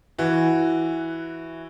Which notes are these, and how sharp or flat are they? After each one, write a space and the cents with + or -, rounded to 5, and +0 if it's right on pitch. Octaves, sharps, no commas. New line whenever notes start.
E3 +0 F#4 +0